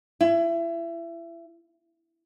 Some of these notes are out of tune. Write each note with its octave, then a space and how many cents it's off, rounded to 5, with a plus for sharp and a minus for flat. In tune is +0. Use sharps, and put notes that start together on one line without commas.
E4 +30